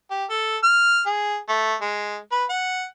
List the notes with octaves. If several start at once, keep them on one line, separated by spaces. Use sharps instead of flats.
G4
A4
F6
G#4
A3
G#3
B4
F#5